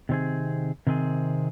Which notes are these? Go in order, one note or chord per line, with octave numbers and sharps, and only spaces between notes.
C3 D#3 C4 G#4
C3 D#3 C4 G#4